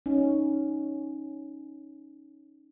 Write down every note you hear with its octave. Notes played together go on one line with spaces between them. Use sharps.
C#4 D#4